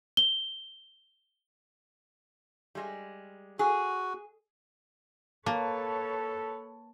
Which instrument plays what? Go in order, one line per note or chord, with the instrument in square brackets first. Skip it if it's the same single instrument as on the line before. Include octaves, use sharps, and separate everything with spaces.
[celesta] G7
[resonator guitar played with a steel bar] G3 G#3
[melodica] F#4 [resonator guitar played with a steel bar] G#4
[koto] A#3 [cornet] A4 [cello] B4 C#5 [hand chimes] A5